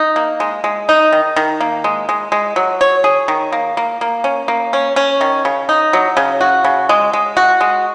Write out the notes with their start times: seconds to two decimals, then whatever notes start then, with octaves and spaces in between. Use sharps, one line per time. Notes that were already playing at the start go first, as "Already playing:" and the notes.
Already playing: D#4
0.16 A#3
0.40 G#3
0.64 G#3
0.89 D#4
1.12 D#3
1.36 D#3
1.60 A#3
1.84 G#3
2.09 G#3
2.32 G#3
2.56 F#3
2.81 C#5
3.04 G#4
3.28 D#3
3.52 A#3
3.77 A#3
4.01 A#3
4.24 C#4
4.48 A#3
4.73 C#4
4.96 C#4
5.21 D#3
5.45 C#3
5.69 D#4
5.93 F#3
6.17 C#3
6.41 F#4
6.64 C#3
6.89 G#3
7.13 G#3
7.37 F#4
7.61 G#3